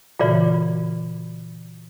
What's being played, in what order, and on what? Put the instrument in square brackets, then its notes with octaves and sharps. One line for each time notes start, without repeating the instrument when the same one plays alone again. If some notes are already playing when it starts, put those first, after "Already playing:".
[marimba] A#2 C#3 E3 [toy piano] F4 F#4 D5